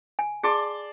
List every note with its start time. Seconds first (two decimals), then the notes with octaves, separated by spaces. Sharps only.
0.19 G#5
0.43 G#4 D5 A5 C6